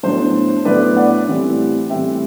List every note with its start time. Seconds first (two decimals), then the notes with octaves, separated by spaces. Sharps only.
0.03 A2 F#3 B3 D4 C5
0.65 A2 F#3 B3 D4 B4 D5
0.96 D5 F#5
1.27 A2 E3 G3 C4 E4
1.90 A2 E3 G3 C4 E4 E5 G5